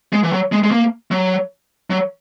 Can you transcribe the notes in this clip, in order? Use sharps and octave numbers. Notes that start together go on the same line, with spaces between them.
G#3
E3
F#3
G#3
G#3
A#3
F#3
F#3